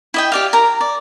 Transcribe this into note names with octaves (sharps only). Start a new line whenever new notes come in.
E4 D#5 G5
G4 D5 F5
A#4 A#5
D5